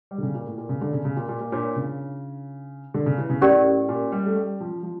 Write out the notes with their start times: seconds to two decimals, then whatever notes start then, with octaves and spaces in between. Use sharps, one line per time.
0.11 G3
0.18 D3
0.23 C#3
0.34 A#2
0.46 A2
0.58 A#2
0.69 C#3
0.81 D3
0.93 C#3
1.05 C#3
1.16 A#2
1.29 A#2
1.41 A#2
1.52 A#2 D4 F4 C#5
1.76 C#3
2.94 D3
3.06 C#3
3.18 E3
3.30 C#3
3.42 A2 C#4 G4 A#4 D5
3.89 A#2
4.12 G3
4.26 A3
4.36 G3
4.61 F3
4.83 F3